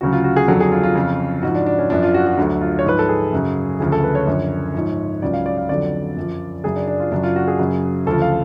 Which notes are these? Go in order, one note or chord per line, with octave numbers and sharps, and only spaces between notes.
D2 C#3 F#3 F#4
F4
F#4
G#4
F2 D3 F#3 A4
G#4
F4
F4
F2 C#3 F3
G#2 F3 F#4
D4
D4
C#4
F#2 F3 D4
F4
F#4
F#4
D2 D3 F#3
F4
C#5
G#2 F3 B4
A4
G#4
F#2 C#3 F#3
D2 C#3 F3 G#4
A4
B4
C#5
F#2 D3 F3
G#2 F3
C#2 C#3 F#3 D5
F5
D5
F5
F2 D3 F#3 D5
F#2 F3
F#2 C#3 F#3 G#4
D4
D4
F4
F#2 C#3 F#3 D4
F4
F#4
G#4
F#2 C#3 F#3
D2 C#3 F3 A4
F5